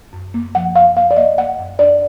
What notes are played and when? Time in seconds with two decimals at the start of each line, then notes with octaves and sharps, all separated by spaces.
0.13 F#2
0.34 A#3
0.55 F3 F#5
0.76 F#2 F5
0.96 A#3 F5
1.11 D5
1.17 A#3 D#5
1.37 A#3 F#5
1.59 F#2
1.79 D4 D5